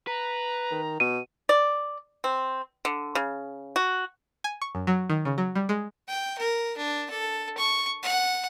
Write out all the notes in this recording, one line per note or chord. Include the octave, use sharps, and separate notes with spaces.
B4 A#5
D#3
B2 D#7
D5
C4
D3
C#3
F#4
G#5
C#6
F#2
F#3
D#3
C#3
F#3
G3
G#3
G5
A#4
D4
A4
C#6
F#5